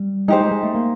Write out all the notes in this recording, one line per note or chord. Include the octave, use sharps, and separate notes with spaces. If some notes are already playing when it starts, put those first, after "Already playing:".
Already playing: G3
G#3 D#4 G4 C5
G#3
G#3
A3
A#3